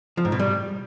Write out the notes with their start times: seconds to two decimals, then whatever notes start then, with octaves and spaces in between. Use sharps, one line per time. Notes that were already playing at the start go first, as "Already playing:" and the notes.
0.17 F3
0.25 G#2
0.32 B2
0.39 G3